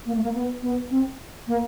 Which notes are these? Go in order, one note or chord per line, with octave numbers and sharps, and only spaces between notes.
A#3
A3
A#3
B3
B3
C4
A#3